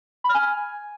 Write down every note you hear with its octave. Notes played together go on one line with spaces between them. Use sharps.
B5
F6
G#5